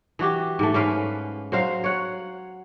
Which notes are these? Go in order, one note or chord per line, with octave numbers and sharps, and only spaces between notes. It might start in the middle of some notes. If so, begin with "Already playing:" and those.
E3 F#4 G4
G#2 A3
G#2 C#4 B4 F5
F#3 C5 F5
C#5 F#5